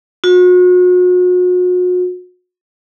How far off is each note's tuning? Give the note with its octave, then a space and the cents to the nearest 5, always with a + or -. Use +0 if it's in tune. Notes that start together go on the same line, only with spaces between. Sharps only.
F#4 -40